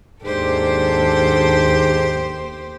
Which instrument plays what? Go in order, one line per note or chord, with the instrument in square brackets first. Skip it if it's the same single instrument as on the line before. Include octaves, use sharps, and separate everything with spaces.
[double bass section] D#2 [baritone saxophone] G#2 [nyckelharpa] D4 A4 [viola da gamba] G4 C5